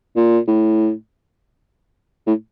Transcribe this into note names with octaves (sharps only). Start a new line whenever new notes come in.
A#2
A2
A2